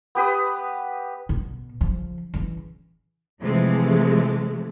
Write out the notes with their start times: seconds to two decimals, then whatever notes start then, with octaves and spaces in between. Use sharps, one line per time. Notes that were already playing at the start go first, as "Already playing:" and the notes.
0.15 B3 G4 B4 D#6
1.29 B2
1.81 C#3 F3
2.34 C#3 E3
3.40 C3 E3 F3 G#3 A3